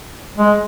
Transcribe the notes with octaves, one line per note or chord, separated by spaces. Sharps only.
G#3